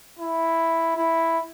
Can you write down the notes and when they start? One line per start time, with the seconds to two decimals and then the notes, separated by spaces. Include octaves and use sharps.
0.19 E4
0.97 E4